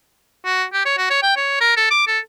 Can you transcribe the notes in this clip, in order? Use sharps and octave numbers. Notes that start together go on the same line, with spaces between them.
F#4
G4
C#5
F#4
C#5
G5
C#5
A#4
A4
D6
A4